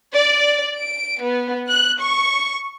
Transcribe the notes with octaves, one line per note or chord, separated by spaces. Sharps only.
D5
D7
B3
F#6
C#6